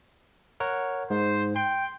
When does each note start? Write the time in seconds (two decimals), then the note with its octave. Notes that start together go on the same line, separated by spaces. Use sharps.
0.60 A#4 C#5 F#5
1.10 G#2 C5
1.56 G5 C6